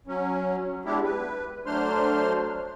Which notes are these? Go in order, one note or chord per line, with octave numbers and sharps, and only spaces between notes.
F#3 C#4
G#3 B3 D4 E4 G4
B4
F#3 A3 D4 C5 C6 F6